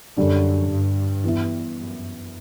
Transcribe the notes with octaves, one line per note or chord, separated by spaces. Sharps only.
F#2 D3 G3 D4
G2
E3 B3 E4
F#2